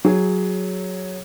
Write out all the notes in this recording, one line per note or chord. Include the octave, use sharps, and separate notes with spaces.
F#3 G#4